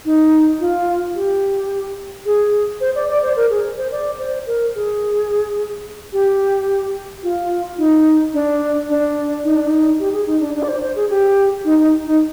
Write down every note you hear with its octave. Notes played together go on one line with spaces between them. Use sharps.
D#4
F4
G4
G#4
C5
D5
D5
C5
A#4
G#4
C5
D5
C5
A#4
G#4
G4
F4
D#4
D4
D4
D#4
D4
D#4
G4
G#4
D#4
D4
D4
D5
C5
C5
G#4
G4
D#4
D#4
D#4